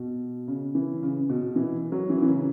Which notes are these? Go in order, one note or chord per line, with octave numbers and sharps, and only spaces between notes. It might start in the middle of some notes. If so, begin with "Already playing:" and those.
Already playing: B2
C#3
E3
C#3
B2
B2
E3
F#3
E3
E3
C#3